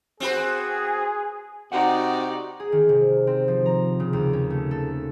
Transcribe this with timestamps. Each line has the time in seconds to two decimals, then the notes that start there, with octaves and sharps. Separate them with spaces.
0.20 C4 F#4 G#4 B4
1.72 C3 D#4 F#4 D5 F#5
2.60 G#4
2.72 D#3
2.89 C3
3.27 C4
3.48 F3
3.66 A#5
4.00 C#3
4.13 D#2
4.33 C#4
4.50 A3
4.71 A4